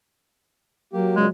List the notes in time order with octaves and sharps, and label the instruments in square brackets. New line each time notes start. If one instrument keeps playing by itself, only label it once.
[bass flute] F#3 [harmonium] A#3 G4
[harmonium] A#2 C#3 [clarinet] G#3